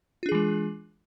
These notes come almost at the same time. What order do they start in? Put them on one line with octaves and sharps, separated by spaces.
F4 D4 G#4 E3 G#3